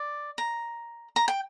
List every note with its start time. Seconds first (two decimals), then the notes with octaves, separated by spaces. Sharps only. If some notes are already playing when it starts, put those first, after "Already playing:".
Already playing: D5
0.38 A#5
1.16 A#5
1.28 G5